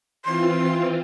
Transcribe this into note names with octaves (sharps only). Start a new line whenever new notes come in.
E3 C4 F4 C6